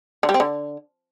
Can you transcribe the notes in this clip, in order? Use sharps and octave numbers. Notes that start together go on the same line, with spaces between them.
D3
G3
C4
D3